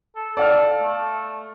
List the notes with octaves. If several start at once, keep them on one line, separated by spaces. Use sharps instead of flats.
A4
A4 D5 F5 F6
A3